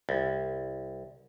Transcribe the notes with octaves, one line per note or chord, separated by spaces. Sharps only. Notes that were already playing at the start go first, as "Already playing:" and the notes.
C2